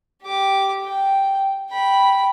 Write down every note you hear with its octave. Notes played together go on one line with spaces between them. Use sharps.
G4 D6
G5
G5 B5